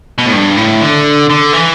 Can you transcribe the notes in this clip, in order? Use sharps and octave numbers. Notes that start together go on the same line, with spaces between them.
B2
A2
G2
A2
D3
D3
E3